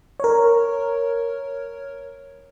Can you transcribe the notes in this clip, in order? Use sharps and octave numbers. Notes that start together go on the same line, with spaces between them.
A#4 C#5